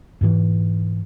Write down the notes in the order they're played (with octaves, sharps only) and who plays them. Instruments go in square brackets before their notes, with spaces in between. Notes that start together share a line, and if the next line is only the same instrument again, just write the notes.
[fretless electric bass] G#2 B2 E3